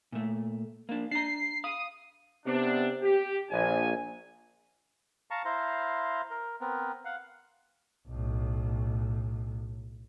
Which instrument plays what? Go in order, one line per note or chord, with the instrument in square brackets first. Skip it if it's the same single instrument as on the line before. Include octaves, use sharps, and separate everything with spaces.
[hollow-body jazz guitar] A#2 A3
A#3 D4
[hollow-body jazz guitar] D4 A#5 [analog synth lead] C7
[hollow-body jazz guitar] F5 B5 [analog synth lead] D#6
[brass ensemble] C3 B3 D4
G4
A#1 G#5
[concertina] F5 A5 A#5 C#6
E4 C5 F5 A#5 C6
A#4
B3 C4 A#4
F5 F#5
[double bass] B1 A2